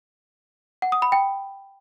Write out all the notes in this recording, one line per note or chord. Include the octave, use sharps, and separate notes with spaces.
F#5
D#6
B5
G5